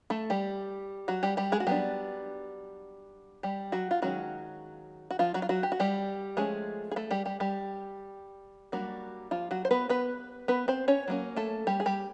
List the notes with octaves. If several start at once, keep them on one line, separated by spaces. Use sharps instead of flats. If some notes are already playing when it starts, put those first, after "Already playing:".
A3 A4
G3 G4
F#3 F#4
G3 G4
G3 G4
G#3 G#4
F#4
F#3 G3 B3 D4 G4
G3 G4
F#3 F#4
F4
D#3 F#3 G#3 C#4 F#4
F#4
F3 F4
F#3 F#4
F4
F#3 F#4
G4
F#4
G3 G4
F3 G#3 A3 C#4 G#4
G#4
A3 A4
G3 G4
G3 G4
G3 G4
F#3 G3 A#3 D4 F#4
F3 F4
F#3 F#4
C5
B3 B4
B3 B4
B3 B4
C4 C5
C#4 C#5
F#3 A#3 C#4
A3 A4
G3 G4
G#4
G3 G4